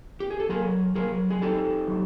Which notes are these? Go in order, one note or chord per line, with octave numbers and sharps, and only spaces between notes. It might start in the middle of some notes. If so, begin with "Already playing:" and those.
G4
G#4
A4
F#3 G#4 A#4
F#3 G#4 A#4
G#4
D#4 G4 A4
F#3